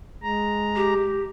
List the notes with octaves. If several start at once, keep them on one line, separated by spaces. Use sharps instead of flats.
G#3 A#5
G4